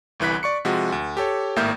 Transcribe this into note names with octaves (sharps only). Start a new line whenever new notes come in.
G1 C2 E3 F#6 B6
D5 C#6 C#7
C3 F3 G#3 F#4
D2
G4 A4 C#5
G#1 A2 A#3 E5 F6 G6